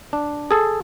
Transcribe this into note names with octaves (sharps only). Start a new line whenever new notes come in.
D4
G#4 A4